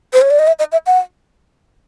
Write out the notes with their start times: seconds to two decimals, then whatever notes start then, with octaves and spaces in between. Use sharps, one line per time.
0.13 C5
0.21 C#5
0.30 D5
0.39 D#5
0.47 E5
0.59 D#5
0.72 E5
0.86 F#5